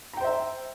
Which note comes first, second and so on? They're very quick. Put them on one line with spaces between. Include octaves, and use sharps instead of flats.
A#5 G5 C5 E5